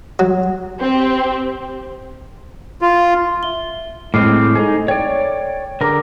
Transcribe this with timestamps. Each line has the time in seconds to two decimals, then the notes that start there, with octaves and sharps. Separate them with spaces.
0.19 F#3
0.81 C4 G4
2.81 F4
3.43 E5 G7
4.14 A2 G#3 C4 D6 F6 C7
4.55 D#4 G#4 A4 C5
4.88 C#5 D5 G5
5.81 D3 G#4 A#4 A#5 D6